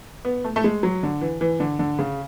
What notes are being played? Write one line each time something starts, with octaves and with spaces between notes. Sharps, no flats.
B3
A3
A3
G#3
F#3
D3
E3
E3
D3
D3
C#3